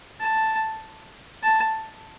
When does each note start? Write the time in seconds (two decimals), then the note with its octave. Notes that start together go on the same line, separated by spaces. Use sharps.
0.20 A5
1.43 A5